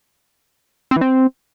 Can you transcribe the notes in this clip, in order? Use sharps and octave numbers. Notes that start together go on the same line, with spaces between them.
C4
E3
C4